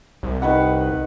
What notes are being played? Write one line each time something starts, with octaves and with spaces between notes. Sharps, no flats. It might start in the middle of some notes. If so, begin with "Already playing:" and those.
C2
D#3 B4 F#5